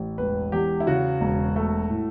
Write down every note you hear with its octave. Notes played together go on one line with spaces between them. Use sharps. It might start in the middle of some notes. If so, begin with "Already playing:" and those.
Already playing: A1
E1 B4
E2 G4
E4
C#3 F#4
E1
A3
A2